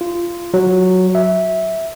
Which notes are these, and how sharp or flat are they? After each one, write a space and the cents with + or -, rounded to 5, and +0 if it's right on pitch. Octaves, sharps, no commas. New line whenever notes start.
F4 -15
F#3 +0
E5 -10